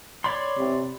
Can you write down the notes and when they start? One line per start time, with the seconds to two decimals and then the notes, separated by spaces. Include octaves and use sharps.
0.24 C#5 D5 B5 C6
0.58 C3